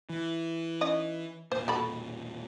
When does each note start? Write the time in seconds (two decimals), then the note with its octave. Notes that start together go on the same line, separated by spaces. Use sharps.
0.10 E3
0.81 C#4 D#4 D#5
1.52 E1 A#2 C5
1.68 F#4 A4 B5